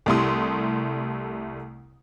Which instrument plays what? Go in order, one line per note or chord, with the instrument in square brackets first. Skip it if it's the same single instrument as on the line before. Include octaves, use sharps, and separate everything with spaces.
[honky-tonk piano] C2 G3 A3 E4 C6 D#6